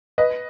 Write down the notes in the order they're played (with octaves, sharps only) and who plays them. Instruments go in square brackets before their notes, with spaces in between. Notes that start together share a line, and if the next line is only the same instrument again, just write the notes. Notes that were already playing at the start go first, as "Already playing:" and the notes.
[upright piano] B4 D#5